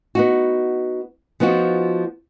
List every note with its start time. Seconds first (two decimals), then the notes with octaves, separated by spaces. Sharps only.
0.15 B3 D#4 F#4
1.40 F3 B3 D#4 F4 F#4